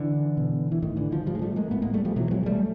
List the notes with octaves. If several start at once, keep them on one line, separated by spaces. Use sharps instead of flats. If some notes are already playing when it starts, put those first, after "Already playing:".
Already playing: D3 E3
B2
E3
A2 D#3
D3 E3
D#3 F3
A2 F3 G3
G#3
G3 A3
G#3 A#3
A2 A3 B3
G#3 A#3
G3 A3
F3 G3
B2 E3 F#3
F#3 G#3
G3 A3